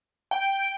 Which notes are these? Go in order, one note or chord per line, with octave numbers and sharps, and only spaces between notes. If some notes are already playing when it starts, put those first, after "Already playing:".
G5